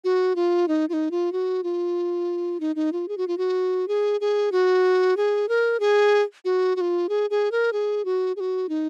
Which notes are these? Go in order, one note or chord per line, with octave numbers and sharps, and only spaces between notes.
F#4
F4
D#4
F4
D#4
F4
F#4
F4
D#4
D#4
F4
G#4
F#4
F4
F#4
G#4
G#4
F#4
G#4
A#4
G#4
F#4
F#4
F4
G#4
G#4
A#4
G#4
F#4
G#4
F#4
D#4